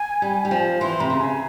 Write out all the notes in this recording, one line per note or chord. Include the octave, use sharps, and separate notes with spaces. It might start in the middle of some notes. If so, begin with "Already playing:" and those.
Already playing: G#5
G3
G3
F3
E3 C6
C3 A#5
C#3
G#5